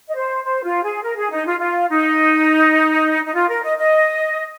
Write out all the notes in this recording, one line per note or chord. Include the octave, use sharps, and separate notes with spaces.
D#5
C5
C5
F4
G#4
A#4
G#4
D#4
F4
F4
D#4
D#4
F4
A#4
D#5
D#5